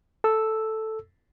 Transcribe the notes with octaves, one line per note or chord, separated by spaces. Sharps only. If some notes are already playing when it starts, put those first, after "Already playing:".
A4 E6